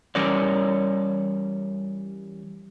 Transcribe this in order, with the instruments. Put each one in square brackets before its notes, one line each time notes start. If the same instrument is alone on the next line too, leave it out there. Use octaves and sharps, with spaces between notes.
[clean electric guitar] E3 G3 C#4 A#4 C#5 D5